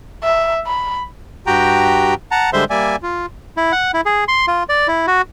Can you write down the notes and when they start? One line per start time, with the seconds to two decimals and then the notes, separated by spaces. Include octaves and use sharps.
0.23 E5
0.67 B5
1.47 G2 F#4 G4 G5 A#5
2.31 F#5 A5 A#5
2.53 D3 G3 G#3 C5 E5 C6
2.70 G3 A#3 D5 E5 G#5
3.03 F4
3.57 E4
3.72 F#5
3.94 E4
4.05 G#4
4.28 C6
4.48 F4
4.69 D5
4.88 E4
5.07 F#4